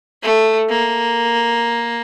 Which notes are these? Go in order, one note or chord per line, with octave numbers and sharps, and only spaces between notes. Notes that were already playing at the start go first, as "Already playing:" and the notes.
A3
A#3